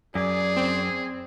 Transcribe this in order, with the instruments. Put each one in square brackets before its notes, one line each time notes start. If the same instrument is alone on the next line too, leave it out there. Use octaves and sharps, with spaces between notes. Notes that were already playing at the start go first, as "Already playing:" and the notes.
[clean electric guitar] F#2 [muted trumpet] G#4 [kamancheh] D5
[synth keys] C4